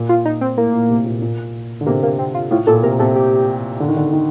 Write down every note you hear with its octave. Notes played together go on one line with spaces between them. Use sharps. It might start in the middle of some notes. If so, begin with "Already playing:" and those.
Already playing: A#2
F4
D#4
C4
A2 A#3
A#2
C3
A#2
A#2
D3
C3 A#3
A#3
C4
F4
A2 F4
A#2 A4
C3 A#4
C3 A4
G4
D3
D#3
D3
D#3